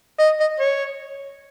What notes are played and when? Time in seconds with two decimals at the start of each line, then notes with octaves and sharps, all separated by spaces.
0.19 D#5
0.40 D#5
0.60 C#5